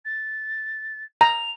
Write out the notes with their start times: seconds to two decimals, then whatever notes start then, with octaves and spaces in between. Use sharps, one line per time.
0.05 A6
1.21 A#5 F7